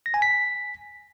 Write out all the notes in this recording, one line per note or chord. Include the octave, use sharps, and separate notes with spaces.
A#6
G#5
B6